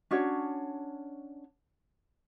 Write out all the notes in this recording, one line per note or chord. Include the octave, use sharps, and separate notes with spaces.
C#4 D4 F#4 C#5